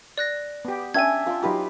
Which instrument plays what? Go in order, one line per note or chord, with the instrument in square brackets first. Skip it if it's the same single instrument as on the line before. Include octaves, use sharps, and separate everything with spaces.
[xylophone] D5 F#6 A#6
[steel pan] B3 G4
[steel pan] C#4 [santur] D4 E5 G5 [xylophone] G#5 G#6
[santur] F4 C6
[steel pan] F#3 D#4 F4 [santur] G4 B4